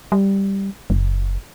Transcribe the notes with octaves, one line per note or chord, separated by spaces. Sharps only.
G3
F#1